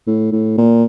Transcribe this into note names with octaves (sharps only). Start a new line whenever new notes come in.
A2
A2
A#2